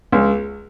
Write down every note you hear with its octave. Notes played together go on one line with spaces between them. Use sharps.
C#2